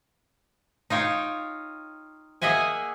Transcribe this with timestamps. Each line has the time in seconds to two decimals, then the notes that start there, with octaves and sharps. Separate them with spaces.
0.90 D#4 F4 C#5 G5
2.42 A#3 G#4 D#5 E5 F#5 G#5